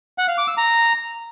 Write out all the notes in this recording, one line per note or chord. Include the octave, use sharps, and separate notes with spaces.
F#5
F5
D6
E6
A#5